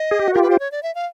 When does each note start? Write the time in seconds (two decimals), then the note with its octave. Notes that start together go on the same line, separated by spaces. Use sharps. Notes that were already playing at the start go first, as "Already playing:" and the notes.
Already playing: D#5
0.11 G#4
0.19 G4
0.28 F#4
0.34 F4 G4 A#4
0.42 B4
0.50 C5
0.60 C#5
0.72 D5
0.83 E5
0.95 F5